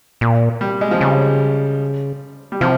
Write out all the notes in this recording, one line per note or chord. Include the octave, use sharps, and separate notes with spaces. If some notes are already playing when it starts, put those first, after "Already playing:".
A#2
G3
G#3
F3
C#3 G3
G3
C3 F3